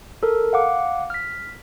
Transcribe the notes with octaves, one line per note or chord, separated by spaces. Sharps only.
A4 A#4 E6
F5 F#5 D6
F6 B6